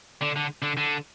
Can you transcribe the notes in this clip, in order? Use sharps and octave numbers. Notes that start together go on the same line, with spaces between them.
D3
D3
D3
D3